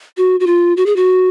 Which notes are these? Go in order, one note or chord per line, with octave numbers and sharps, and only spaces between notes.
F#4
F#4
F4
F#4
G#4
F#4